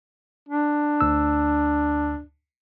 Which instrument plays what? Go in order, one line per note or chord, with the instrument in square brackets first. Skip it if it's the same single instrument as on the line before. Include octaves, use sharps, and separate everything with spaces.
[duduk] D4
[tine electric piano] D2 E6